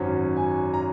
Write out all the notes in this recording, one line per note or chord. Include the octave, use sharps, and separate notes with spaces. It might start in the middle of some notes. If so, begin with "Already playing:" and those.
Already playing: G#1 F#2 F#3 C#4
G#5
A#5